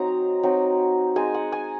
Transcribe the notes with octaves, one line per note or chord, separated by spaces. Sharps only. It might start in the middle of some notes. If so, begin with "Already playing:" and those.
Already playing: F#3 C4 D#4 A#5
F#3 C4 D#4
G#3 C4 D#4 G#5
F#5
G#5